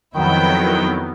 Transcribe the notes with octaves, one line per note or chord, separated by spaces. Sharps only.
F2 D#3 F#3 B3 E4 G5